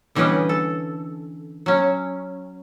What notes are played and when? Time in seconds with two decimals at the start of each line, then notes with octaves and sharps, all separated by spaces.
0.15 D3 E3 G3 C#4 B4 D#5
0.49 A4
1.66 F#3 C#4